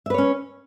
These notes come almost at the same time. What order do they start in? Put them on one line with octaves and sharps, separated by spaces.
E5 B4 C#5 C#4